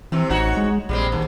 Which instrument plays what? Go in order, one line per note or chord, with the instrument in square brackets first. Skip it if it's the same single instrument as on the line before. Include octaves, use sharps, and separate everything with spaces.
[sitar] C3 C4 [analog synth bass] E3
[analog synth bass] A1 [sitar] D#4 F#4 C#5
[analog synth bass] G#3
[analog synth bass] A#1 [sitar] G3 G#3 C4
[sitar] D#2